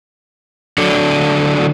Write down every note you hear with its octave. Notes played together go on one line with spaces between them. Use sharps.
D3 F#3 D4 A4